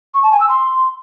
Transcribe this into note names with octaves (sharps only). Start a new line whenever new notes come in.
C#6
A5
G#5
E6
C6